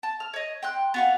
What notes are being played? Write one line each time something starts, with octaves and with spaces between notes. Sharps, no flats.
A5
F6
C#5 D#5
G5 C6 F#6
B3 F#4 F5